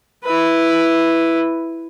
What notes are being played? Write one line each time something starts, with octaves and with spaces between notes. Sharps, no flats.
E4 B4